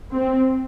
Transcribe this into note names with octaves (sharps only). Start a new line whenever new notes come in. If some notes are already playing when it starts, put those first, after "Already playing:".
C4